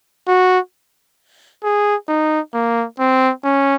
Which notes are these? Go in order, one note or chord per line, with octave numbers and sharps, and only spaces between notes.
F#4
G#4
D#4
A#3
C4
C#4